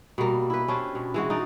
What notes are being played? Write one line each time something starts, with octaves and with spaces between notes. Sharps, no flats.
B2 G3 A#3
E4 B4
C#4 D4 G4 C5
B2
E3 G#3 F#4
D#4 F#4 D5